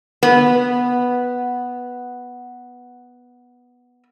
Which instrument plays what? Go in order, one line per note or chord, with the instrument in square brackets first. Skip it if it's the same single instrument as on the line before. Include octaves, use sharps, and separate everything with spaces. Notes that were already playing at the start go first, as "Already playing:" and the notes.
[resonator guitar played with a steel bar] B3